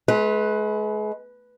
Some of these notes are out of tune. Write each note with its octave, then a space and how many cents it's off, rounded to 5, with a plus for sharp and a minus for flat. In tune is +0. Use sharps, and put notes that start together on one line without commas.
G#3 +40 B4 +0